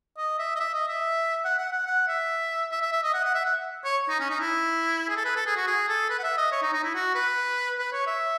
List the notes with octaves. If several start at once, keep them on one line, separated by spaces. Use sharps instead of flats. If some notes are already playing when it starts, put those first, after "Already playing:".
D#5
E5
D#5
E5
D#5
E5
F#5
F#5
F#5
F#5
E5
E5
E5
E5
D#5
F#5
F#5
E5
F#5
C#5
D#4
C#4
D#4
E4
G#4
A4
B4
A4
G#4
F#4
G#4
A4
B4
F#5
E5
D#5
C#5
D#4
D#4
E4
F#4
B4
B4
C#5
E5